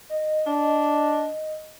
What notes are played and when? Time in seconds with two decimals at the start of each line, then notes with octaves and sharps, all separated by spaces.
0.09 D#5
0.47 D4